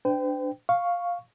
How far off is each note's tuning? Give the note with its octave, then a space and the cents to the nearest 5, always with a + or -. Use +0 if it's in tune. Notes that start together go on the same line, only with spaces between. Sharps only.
D4 +0 C5 -45 G5 +0
F5 +5 C#6 +0